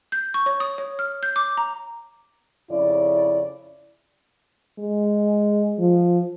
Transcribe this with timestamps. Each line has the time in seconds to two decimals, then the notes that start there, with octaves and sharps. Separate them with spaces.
0.12 G6
0.34 C#6
0.46 C#5
0.60 D#6
0.78 C#5
0.99 F6
1.23 G6
1.36 D6
1.57 A#5
2.71 F2 C#3 E4 D5
4.79 G#3
5.79 F3